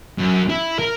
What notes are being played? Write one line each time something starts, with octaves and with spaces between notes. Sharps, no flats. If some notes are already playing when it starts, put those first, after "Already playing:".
F#2
E4
A#4